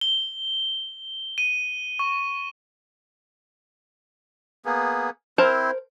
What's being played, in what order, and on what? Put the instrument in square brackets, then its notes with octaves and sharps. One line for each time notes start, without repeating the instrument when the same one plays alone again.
[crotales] G7
D#7
C#6
[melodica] A#3 B3 G#4
[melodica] C4 E4 [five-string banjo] A#4 C5 A5